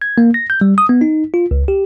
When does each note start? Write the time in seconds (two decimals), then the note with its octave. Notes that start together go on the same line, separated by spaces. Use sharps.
0.02 G#6
0.18 A#3
0.34 A#6
0.50 G6
0.61 G3
0.78 D#6
0.89 B3
1.01 D#4
1.34 F4
1.51 C#2
1.68 G4